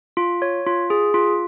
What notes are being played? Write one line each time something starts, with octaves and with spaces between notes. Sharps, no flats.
F4
C#5
F4
G#4
F4